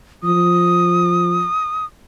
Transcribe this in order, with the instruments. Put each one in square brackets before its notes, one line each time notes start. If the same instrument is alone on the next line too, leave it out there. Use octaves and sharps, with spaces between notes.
[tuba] F3 [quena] D#6